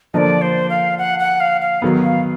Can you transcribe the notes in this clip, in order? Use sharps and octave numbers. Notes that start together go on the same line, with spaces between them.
D3 F3 A#3 D5 D#5
C5
F5
F#5
F#5
F5
F5
D#3 F#3 B3
F5